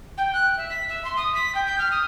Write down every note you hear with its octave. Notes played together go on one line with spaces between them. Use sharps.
G5
F#6
E5
B6
E5
C6
D#6
B6
G5
G6
F6
D#6